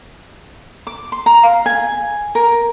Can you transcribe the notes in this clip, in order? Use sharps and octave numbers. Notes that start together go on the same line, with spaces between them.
D6
C6
A#5
F5
G#5
A#4